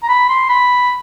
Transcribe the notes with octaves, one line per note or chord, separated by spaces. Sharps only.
A#5
B5
C6
B5